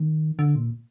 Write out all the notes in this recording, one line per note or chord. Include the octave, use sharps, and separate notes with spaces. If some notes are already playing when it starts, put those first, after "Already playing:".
Already playing: D#3
D3
A#2